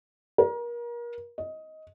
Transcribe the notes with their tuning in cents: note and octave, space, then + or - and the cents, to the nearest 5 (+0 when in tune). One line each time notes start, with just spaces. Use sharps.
A#4 +30
D#5 +15